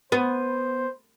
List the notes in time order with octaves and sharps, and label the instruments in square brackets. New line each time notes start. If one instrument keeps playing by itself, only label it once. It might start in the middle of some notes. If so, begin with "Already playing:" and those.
[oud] B3 [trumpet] C5